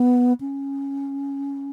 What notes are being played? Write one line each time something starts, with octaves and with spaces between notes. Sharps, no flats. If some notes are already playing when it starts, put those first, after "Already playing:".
Already playing: B3
C#4